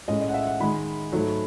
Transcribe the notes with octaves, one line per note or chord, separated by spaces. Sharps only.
A2 G#3 C#4 D#5
D#5
F#5
E5
F#5
D#3 G#3 D#4 B5
G#2 F#3 A3